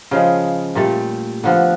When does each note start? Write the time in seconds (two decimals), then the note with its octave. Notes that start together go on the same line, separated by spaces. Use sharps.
0.11 C#3 F3 G#3
0.75 A#2 G3 A3
1.44 D3 F3 B3